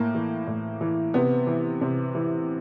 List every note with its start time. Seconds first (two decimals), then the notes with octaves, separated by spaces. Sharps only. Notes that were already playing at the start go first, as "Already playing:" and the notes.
Already playing: A2 A#3
0.14 E3
0.47 A2
0.81 E3
1.14 C3 B3
1.47 E3
1.81 C3
2.15 E3